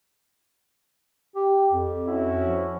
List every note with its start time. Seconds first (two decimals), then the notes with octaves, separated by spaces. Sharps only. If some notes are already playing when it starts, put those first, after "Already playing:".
1.35 G4
1.73 F2
2.07 C#4 E4 F#4
2.42 F3